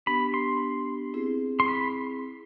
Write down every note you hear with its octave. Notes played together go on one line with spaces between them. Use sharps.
B3 D4 G4 B5
C6
C4 E4 G#4
C6
B5